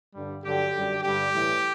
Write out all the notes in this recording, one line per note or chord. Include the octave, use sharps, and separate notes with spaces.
G2 D3 G3
G2 D3 F#3 G4
F#2 D3 G3
G2 D3 G3 G4
A2 E3 G3